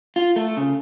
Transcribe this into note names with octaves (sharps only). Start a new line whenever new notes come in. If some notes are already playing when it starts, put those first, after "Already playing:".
F4
A3
C#3